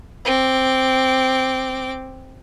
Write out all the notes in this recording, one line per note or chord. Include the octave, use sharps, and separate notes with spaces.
C4 D6